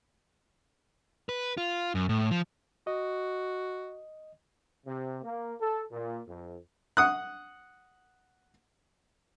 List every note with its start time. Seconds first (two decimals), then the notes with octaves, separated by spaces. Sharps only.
1.29 B4
1.57 F4
1.95 F#2
2.09 A2
2.31 F3
2.87 F#4 D#5
4.86 C3
5.22 A#3
5.61 A4
5.91 A#2
6.27 F2
6.97 F#5 D#6 F#6